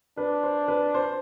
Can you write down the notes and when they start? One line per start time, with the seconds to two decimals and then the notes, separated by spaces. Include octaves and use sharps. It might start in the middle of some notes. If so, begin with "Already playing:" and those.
0.17 D4 B4
0.43 C5
0.68 B4
0.94 C5